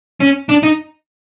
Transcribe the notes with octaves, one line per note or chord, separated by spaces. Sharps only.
C#4
D4
D#4